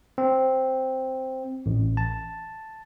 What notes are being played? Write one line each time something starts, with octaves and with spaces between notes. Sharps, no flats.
C4
A1
A5